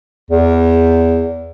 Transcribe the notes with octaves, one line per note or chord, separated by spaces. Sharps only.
E2